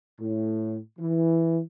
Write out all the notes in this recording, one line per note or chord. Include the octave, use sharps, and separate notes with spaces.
A2
E3